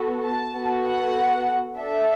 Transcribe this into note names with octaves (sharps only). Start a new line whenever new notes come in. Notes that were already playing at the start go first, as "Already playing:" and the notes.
Already playing: B3 F#4 A4
A5
B3 F#4 A4
F#5
D4 A4 E5